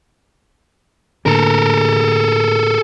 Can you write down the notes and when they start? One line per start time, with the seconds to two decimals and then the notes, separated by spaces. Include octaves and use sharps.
1.26 A2 D3 A#3 A4 A#4